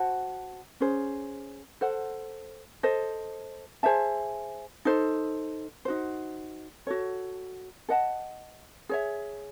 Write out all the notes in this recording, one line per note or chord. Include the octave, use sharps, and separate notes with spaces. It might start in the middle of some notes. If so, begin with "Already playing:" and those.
Already playing: F#4 C5 F#5 A5
C#4 G#4 C5
A4 C5 F#5
A4 C5 D#5
G#4 C5 E5 A5
D#4 A4 C5
D#4 F#4 C5
F#4 A4 C#5
A4 D#5 F#5 A5
G#4 C#5 E5